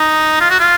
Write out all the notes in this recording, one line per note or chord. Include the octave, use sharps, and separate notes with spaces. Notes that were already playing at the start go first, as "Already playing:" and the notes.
Already playing: D#4
F4
F#4
F4